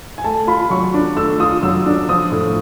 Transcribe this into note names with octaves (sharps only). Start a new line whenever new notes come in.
G#5
A3 A5
F4 B5
F#3 C#6
D4
A3 E6
F4 D#6
F#3 E6
D4
F3 D#6
A2